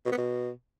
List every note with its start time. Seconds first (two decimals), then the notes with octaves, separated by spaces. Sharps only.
0.06 B2
0.12 B3
0.18 B2